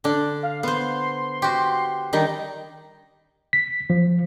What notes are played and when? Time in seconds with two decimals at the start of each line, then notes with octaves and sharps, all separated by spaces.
0.04 D3 D4
0.43 F5
0.63 B3 C5 C6
1.42 F#4 G4
2.13 D#3 G3 D4 D#4
3.53 B6
3.90 F3